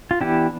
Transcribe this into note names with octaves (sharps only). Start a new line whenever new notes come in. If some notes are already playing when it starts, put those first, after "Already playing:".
F4
E3 B3 D4 E4 G4